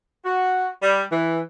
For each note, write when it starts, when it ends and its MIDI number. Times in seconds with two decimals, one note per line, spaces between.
0.24 0.68 66
0.81 1.04 55
1.11 1.40 52